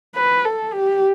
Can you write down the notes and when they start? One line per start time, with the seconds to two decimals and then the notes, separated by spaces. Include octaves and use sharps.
0.16 B4
0.45 A4
0.73 G4